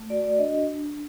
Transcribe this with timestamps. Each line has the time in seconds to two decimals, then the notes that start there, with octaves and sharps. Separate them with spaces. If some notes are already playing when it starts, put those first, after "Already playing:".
Already playing: A3
0.10 F#4 D5
0.24 D5
0.38 D4 D#5